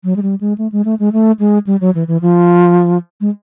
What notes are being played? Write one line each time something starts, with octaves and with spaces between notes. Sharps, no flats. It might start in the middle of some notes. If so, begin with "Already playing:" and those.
F#3
G#3
G3
G#3
A3
G#3
A3
G#3
A3
G#3
G3
F#3
E3
E3
F3
G#3